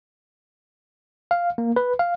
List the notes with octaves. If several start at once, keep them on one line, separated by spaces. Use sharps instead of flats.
F5
A#3
B4
F5